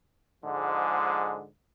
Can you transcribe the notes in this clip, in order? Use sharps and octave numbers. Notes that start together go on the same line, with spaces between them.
G#2 D3 F3 G#3